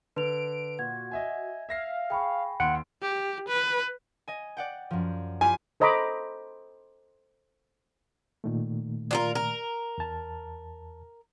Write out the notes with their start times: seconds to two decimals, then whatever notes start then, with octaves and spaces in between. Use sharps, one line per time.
0.16 D3 B4 D7 F7
0.79 A#2 F#4 G#6
1.11 D#5 E5 G#5
1.69 E5 F5 A#6 C7
2.10 G#4 G5 B5 C#6
2.60 D#2 F#5 C6 D7
3.02 G4
3.48 B4
4.28 D#5 G#5
4.57 D5 F#5 G5
4.91 F#2 F3
5.41 E4 F4 G4 G#5
5.80 A4 C5 D#5 A#5 B5 D6
8.44 A#2 D#3 A3
9.11 D4 F4 A#4
9.35 A#4
9.98 E2 A5